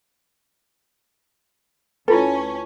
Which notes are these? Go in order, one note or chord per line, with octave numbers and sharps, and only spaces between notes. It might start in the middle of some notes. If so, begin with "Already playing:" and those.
D2 C#4 E4 F4 A4 B4